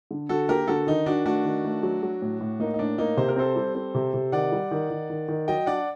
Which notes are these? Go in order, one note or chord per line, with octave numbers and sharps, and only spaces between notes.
D3
D3 F#4 A4
A#3 G4 A#4
D3 F#4 A4
D#3 D#4
D#3 D4 F#4
A3 D4 F#4
D#3
A3
F#3
F#3
A2
A2
A#3 D#4
D#4
A2 D4
A#3 D#4
C3 C5
A#4
C4 A4 C5
G3
C4
C3
C3
D#3 D5 F#5
G3
D#3
D#3
D#3
D#3
F#3 D#5 G5
D4 D5 F#5